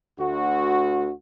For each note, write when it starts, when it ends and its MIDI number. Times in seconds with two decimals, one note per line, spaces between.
0.19 1.12 38
0.19 1.12 66